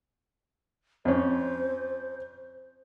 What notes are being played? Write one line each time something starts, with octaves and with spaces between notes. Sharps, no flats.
F2 C#4 C5